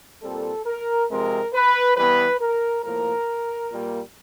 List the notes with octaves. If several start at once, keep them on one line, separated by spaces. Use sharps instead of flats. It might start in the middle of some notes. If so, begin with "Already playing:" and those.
A#2 G3 C4 A4
A#4
C3 F3 G#3 C4 A#4
B4
E3 G3 B3 B4
A#4
A2 F3 A#3 A#4
A#2 G3 A#3